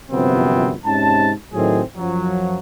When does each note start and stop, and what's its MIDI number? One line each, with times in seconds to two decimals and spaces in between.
0.11 0.73 31
0.11 0.73 42
0.11 0.73 48
0.11 0.73 53
0.11 0.73 59
0.11 0.73 60
0.85 1.32 44
0.85 1.32 48
0.85 1.32 61
0.85 1.32 63
0.85 1.32 81
1.53 1.81 45
1.53 1.81 51
1.53 1.81 54
1.53 1.81 57
1.53 1.81 60
1.53 1.81 68
1.96 2.59 42
1.96 2.59 53
1.96 2.59 54